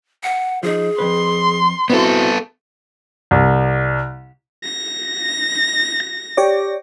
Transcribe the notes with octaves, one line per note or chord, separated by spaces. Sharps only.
F#5
F3 D#4 G#4
F2 B2 B4 C6
B2 B3 C4 E4 F#4 A4
C2
A#6
G4 C#5 D5